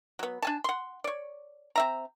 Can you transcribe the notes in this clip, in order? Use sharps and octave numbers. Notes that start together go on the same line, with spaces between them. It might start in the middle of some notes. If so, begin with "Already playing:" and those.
F#3 B3
D4 G#5 A5
F#5 C6
C#5 D5
C4 E5 A#5